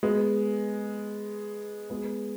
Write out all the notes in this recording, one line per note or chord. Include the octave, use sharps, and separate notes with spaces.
G#3 B3
G#3 B3